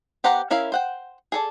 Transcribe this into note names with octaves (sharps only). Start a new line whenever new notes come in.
B3 G4 C5 F#5 A#5
C#4 E4 A#4 E5 F5
C5 F#5 G5
G#4 A4 D5